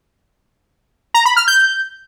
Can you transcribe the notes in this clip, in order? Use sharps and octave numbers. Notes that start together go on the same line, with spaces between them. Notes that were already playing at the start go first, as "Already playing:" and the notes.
A#5
B5
F6
G6